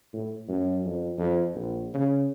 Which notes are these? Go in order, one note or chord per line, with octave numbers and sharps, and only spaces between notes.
A2
F#2
F2
F2
A#1
C#3